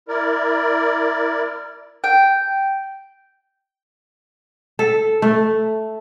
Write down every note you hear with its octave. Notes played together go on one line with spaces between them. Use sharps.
E4 A#4 D5
G5
A4
A3